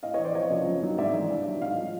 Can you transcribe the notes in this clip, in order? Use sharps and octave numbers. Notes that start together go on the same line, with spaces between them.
A2 D#5 F5
E3 C#5 D#5
C5 D5
F2 C#5 D#5
C#3 F3
F#2
D#3 F#3
G#2 D5 E5
E3
G2
D#3 F#3
G#2 D#5 F5
F3